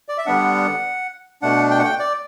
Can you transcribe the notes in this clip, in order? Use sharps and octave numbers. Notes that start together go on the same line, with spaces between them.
D5
E5
D3 G3 B3 D4 F#5
B2 A3 D4 F#5
G5
F#5
G5
D5